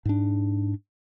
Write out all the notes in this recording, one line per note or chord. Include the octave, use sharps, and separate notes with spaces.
G#2 D4